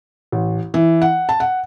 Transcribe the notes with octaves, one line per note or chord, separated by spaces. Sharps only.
A1
E3
F#5
A5
F#5